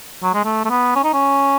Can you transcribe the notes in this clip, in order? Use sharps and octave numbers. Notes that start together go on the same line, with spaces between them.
F#3
G#3
A3
A3
B3
C#4
D#4
C#4